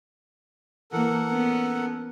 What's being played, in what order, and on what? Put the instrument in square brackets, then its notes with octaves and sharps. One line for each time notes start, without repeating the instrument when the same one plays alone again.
[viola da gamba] E3 A#3 [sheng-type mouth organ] A4 A#4 F#5
[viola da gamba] B3 C#4